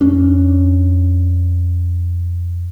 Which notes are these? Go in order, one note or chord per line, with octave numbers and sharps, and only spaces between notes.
F2 C#4 D4